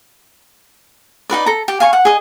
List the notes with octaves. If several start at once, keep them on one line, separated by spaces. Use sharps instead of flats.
D#4 F#4 B4 D5
A4 A#5
G4
F5 G#5 C#6
F#5
G#4 D#5